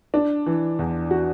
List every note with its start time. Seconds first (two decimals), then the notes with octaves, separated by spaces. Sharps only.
0.14 D4
0.46 E3
0.79 E2
1.11 F#4